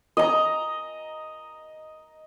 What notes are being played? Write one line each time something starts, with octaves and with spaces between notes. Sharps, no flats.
D#5 A#5